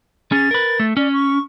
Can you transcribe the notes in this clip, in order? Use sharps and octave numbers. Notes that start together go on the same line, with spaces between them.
C#4 G#4 A6
A#4 B4
A3
C#4 D5
C#6